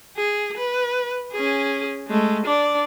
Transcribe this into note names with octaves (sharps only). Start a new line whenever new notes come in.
G#4
B4
C#4 G#4
G#3 A3
D4 D5